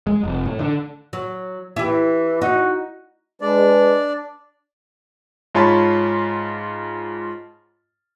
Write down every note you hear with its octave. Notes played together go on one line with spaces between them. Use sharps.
G#3
F1
A2
D3
F#3
E3 E4 G4
D#4 F#4
G#3 D4 B4 D5
G#2 F4 C#5 A5 B5